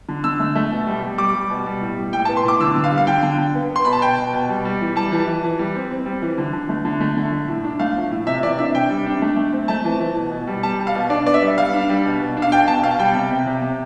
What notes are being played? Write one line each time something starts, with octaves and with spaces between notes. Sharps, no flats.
D3
D3 E6
A3
A3
B2
G3
G3
G3 D6
G3
B2
G3
A2
G3
A2 G5
A5
B3
C6
A2 D6
D3 E6
D3
F5
G3
F5
D3 G5
D3
D3
B3
B3
C6
B2 B5
A5
B2 G5
B2
B2
G3
G3
E3
G3 A5
E3
E3
E3
G3
C4
C4
G3
E3
D3
D3
A3
D3
A3
D3
A3
A2
D4
A3 F5
F3
A2
C3 E5
E3 D5
D4 E5
C3 G5
G3
D4
A3
A3
C4
A3 A5
E3
E3
B2
B2
G3
G3 A5
G3
F5
B2
D4 D5
B3 D5
E5
G3
G3 F5
D4
G3
B2
B2
D4
F5
B2 G5
B2 A5
B2 F5
G3 G5
C3
C3
C3
C3